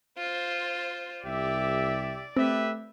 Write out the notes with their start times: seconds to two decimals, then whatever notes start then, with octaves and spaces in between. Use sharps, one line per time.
0.18 F4 C5
1.25 C2 G4 D5 E5
2.37 A3 C4 G4 B4 E5